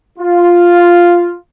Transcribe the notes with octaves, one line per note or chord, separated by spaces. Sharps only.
F4